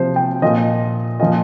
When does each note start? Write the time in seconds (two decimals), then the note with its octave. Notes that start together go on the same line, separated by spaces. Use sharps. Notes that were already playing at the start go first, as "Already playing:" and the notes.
Already playing: C3 F3 C5
0.16 G5
0.42 A#2 F3 D#5
1.20 A#2 F3 D#5